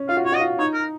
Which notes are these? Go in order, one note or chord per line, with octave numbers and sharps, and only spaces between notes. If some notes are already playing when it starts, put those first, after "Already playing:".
Already playing: C#4
F4 F5
F#4
F4 C#5
F#4 D#5
F4
D#4 C#5
A#4